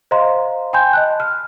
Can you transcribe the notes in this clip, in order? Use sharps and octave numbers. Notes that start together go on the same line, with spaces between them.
C5 D#5 F5 A#5 C6
G5 G#5 B5 C6 G6
D#5 A5 F#6
F6